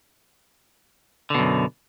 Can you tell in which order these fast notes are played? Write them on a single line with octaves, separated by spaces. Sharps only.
D3 B2 F#2